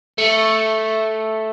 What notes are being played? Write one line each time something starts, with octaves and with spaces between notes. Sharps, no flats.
A3